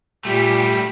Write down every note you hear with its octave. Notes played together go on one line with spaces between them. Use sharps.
A#2 G3 A3 G4